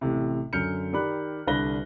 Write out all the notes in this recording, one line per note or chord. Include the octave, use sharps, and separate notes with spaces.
A1 A2 C3
F#2 D3 F6 G6 C#7
D#3 G4 D5 B5 F#6
C2 D3 D4 B4 A#6 G7